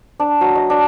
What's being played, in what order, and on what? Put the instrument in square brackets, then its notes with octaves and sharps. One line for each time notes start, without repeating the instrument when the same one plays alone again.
[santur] D4
F#3
D#5
D4